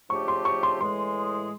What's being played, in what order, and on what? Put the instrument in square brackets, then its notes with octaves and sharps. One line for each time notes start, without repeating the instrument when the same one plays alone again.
[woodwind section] C#3 F3 A3 D4 G4 [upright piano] C#6
[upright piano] C6
C#6
C6
[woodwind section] A2 E3 G#3 [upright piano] C6